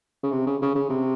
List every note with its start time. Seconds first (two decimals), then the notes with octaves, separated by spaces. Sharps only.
0.23 C#3
0.32 C3
0.47 C#3
0.62 C#3
0.75 C#3
0.90 C3